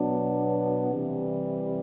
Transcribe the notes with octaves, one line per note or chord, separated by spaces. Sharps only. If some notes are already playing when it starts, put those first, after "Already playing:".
Already playing: B2 F#3 B3 D4
C3 E3 G3